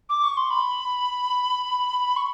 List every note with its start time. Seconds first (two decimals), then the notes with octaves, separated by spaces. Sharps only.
0.09 D6
0.23 C#6
0.37 C6
0.50 B5
2.16 C#6